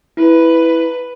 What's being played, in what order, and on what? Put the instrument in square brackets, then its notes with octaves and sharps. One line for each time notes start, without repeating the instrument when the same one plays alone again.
[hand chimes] E4 [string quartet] B4